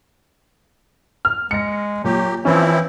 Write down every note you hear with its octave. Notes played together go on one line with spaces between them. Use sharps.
F6
G#3 A#6 C#7
A#2 F#3 G4
E3 F3 C4 C#4 E4